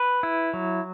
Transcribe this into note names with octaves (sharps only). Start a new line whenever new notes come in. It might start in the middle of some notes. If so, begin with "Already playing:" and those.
Already playing: B4
E4
F#3